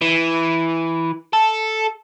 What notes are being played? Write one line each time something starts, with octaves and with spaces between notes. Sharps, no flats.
E3
A4